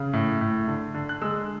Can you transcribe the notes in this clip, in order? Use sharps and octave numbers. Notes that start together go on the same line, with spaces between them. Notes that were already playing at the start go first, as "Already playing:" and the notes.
Already playing: C#3
A2
A2
D3
D3
F#6
G#3 E6